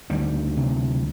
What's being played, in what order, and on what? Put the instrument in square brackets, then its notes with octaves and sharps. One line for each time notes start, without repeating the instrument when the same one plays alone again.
[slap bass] D2 D#3 G3
C3